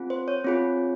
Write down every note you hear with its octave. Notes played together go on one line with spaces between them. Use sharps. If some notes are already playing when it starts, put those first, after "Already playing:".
Already playing: C4 F4 G#4
C5
C#5
C4 F4 G#4